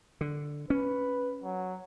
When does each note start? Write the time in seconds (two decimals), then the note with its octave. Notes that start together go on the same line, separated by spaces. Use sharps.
0.21 D3
0.70 C#4 B4
1.43 F#3